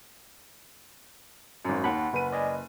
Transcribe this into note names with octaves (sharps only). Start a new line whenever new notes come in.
G#1 F#2
D#2 F#5 B5
F#1 B4 D#7
D5 D#5 G#5